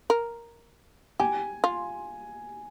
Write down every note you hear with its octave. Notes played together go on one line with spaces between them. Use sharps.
A#4
G4 G#5
F4